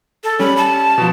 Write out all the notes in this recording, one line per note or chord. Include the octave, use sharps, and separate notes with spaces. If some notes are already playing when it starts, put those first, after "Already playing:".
A4
G3 C#4 B5
A5
B2 F3